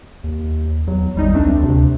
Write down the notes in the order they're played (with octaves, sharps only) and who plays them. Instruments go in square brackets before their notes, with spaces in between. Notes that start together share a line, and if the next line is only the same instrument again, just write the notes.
[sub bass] D#2
[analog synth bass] E2 [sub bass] F#3
[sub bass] G#1 [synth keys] G3 D#4
[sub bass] C#2 [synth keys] A3 C4 D4
[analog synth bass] D2 [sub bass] C3